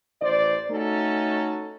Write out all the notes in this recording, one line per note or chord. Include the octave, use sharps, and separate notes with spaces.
A1 C5 D5
A3 C#4 D#4 F#4 A4